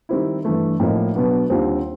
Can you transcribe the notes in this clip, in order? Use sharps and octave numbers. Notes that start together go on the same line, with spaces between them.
D#3 G3 C4 E4
G2 E3 A3
A2 F3 A#3 D#4
B2 F#3 B3 D4
D#2 D3 G3 C4 F4